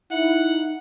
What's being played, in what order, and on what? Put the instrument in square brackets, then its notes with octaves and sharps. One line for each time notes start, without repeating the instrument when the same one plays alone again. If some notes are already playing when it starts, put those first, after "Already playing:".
[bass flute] D#4 [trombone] E4 [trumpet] F#5